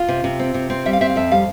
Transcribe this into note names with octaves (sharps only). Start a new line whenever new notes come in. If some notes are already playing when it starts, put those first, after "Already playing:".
Already playing: F4
C3
C3
C4
C3
C4
G3 E5
F5
C4 E5
F5
F2 E5
G3 F5